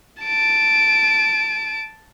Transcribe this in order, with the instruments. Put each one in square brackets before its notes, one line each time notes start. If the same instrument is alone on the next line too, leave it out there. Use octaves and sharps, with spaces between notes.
[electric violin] A5 D7